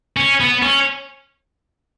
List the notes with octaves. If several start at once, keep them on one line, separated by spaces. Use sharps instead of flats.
C#4
B3
C#4